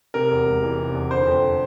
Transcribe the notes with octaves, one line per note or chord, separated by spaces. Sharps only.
C3 A#4
E2
E1
E3
C3
E2
D3 C5
F2